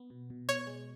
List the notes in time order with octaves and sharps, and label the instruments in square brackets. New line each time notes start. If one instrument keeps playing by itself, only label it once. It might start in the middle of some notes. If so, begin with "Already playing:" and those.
Already playing: [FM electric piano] B3
B2
B2
[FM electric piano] B2 [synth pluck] C#5
[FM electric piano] G#3